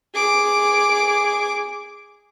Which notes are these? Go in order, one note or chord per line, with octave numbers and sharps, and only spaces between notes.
G#4 D6